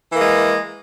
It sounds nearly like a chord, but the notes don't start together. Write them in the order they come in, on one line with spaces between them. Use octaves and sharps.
E3 A#3 G#3